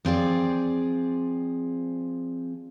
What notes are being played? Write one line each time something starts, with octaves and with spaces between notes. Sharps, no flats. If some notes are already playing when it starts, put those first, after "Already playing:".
F3 C4 G#4 D5